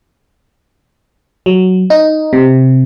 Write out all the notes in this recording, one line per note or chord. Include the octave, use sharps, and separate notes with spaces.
F#3
D#4
C3